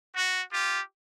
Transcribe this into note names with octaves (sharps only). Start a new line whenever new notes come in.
F#4
F4 G4